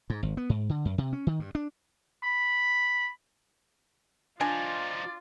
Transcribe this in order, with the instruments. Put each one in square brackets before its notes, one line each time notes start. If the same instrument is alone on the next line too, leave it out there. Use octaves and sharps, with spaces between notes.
[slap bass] G#2
G#1
B3
G#2
D3
F#2
C3
C#4
D#3
G2
D4
[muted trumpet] B5
[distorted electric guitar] F3 D#4 [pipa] D4 G#5 [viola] F4 [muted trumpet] D5